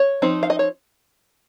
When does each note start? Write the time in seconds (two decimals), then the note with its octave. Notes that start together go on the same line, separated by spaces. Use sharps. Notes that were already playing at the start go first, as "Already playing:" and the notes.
Already playing: C#5
0.22 F3 C4 D#4
0.43 F5
0.50 D#5
0.59 C#5